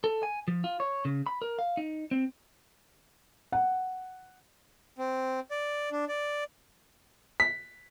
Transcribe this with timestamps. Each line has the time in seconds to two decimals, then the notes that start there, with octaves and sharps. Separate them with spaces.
0.04 A4
0.23 G#5
0.48 F3
0.64 F4
0.80 C#5
1.05 C#3
1.26 B5
1.42 A#4
1.59 F5
1.77 D#4
2.11 C4
3.52 F#5
4.98 C4
5.51 D5
5.92 D4
6.08 D5
7.40 B6